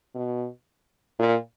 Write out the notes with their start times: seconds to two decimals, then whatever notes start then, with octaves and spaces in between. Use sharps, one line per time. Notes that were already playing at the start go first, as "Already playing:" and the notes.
0.15 B2
1.19 A#2